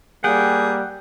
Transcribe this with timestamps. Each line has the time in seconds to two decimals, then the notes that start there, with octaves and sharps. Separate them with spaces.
0.24 G3 A#3 G#4 F#5 G5